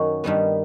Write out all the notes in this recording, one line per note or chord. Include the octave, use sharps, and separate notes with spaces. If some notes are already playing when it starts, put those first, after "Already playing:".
Already playing: F#2 D#3 F#3 F#4
G2 D#3 G3 B3